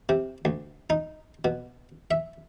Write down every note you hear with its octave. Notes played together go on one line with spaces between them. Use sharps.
C3
D2
D#4
B2
E5